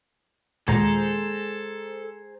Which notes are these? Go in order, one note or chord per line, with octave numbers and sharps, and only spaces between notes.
D#2 A#2 G#3 G#4 A4 C5 A#5